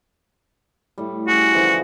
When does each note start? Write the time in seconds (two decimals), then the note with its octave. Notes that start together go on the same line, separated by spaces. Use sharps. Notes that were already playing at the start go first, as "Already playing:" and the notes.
0.98 A2 G3
1.28 G3 C#4 F#4 G#4
1.54 D3 E3 F3